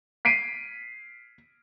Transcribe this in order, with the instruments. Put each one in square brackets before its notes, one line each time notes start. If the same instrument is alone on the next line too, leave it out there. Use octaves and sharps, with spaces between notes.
[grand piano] B6 C7 D7 D#7